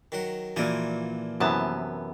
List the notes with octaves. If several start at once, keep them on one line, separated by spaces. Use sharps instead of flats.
D#3 F#3 F#5
A#2 E3 F3 A#3 F4 F#4 D5
F#2 C3 E3 B3 A5